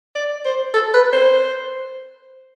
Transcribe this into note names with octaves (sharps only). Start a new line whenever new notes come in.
D5
C5
A4
B4
C5